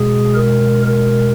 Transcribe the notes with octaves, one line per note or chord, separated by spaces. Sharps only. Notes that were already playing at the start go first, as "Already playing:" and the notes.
Already playing: B2 G#3 G#4
A#4
A#4